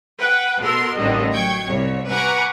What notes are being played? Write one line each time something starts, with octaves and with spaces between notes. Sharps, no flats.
B4 F#5 G5
B2 B3 A4 A#4 C6 E6
A1 D#2 D3 D#3 G3 D#5
F#3 G5 C#6 G#6
C2 C#5
B4 F#5 G#5 A#5 C#6 D6